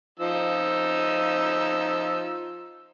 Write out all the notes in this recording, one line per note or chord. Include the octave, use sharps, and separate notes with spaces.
F3 D#4 E6